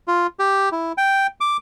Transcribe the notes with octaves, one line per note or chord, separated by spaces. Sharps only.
F4
G4
E4
G5
D6